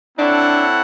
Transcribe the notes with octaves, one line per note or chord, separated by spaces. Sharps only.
C4 D4 E4 A4 C#5 F#5